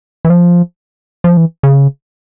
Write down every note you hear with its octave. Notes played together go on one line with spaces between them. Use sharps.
E3
F3
F3
E3
C#3